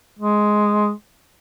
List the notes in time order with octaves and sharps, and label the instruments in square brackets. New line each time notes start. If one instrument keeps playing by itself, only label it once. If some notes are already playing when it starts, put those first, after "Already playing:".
[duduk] G#3